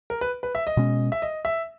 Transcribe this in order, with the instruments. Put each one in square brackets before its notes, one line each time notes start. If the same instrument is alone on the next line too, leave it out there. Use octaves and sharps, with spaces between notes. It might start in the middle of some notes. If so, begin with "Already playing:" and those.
[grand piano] A#4
B4
B4
E5
D#5
[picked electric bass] B2 G#3 C#4
[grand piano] E5
D#5
E5